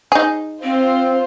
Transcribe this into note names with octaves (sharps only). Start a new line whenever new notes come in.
D#4 G#4
C4 F4 C5